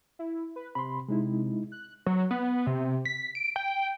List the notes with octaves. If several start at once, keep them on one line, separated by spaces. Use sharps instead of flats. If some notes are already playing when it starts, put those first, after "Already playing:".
E4
B4
C3 B5 C6
C3 G#3 D#4 E4
F#6
F#3
B3
C3
B6
D7
G5